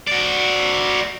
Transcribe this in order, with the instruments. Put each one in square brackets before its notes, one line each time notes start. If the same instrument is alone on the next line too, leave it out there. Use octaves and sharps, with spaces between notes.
[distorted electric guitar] F#4 D5